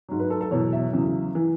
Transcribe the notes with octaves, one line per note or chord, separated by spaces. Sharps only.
G#2 F#3
B4
A4
A4
E2 B2 F#3 C#5
E5
E2 C#3 F#3
E3